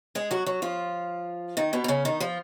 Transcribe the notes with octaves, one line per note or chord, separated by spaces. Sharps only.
G#3 G#4
F#3 F#4
F#3 F#4
F3 F4
D#3 D#4
B2 B3
D#4
C#3 C#4
D#3 D#4
F3 F4